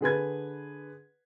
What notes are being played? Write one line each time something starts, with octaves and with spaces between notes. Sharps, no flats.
D3 G#4 B4 G#6